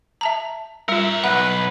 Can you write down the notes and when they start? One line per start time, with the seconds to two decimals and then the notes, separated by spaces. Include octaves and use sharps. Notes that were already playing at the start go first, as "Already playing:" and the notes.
0.21 E5 A5 A#5
0.89 G3 F4 A#4 E5
1.24 B1 B4 F#5